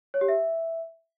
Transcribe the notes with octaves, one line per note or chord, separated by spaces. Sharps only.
C#5
G4
E5